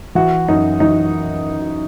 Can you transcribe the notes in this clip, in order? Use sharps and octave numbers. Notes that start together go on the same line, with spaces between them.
E3 F#4
F#2 D#4
E3 D#4